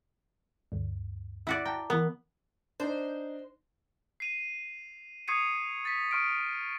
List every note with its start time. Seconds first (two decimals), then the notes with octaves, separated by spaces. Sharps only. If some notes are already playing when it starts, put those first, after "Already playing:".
0.72 D2 G2
1.47 E4 F#4 D5
1.65 G5 A5 A#5
1.90 E3 B3 A#4
2.80 D4 D#4 C5
4.20 C7 D#7 F7
5.28 C#6 D#6 G#6 C7 C#7 D#7
5.85 A6 B6
6.11 C#6 F6 D7